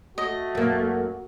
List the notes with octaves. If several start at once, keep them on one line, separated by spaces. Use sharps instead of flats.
A3 F#4 D#5
F#2 A#3